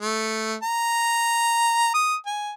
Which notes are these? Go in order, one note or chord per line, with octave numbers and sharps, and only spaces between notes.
A3
A#5
D#6
G#5